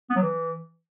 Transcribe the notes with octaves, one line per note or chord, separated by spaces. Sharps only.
B3
F#3
E3